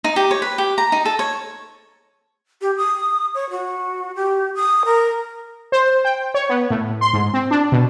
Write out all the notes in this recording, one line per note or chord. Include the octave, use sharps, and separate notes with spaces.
D#4
G4
C#5
B4
G4
A#5
D#4
A4
C#5
G4
D#6
C#5
F#4
G4
D#6
A#4
C5
G5
C#5
B3
A2
C6
G#2
C4
D4
B2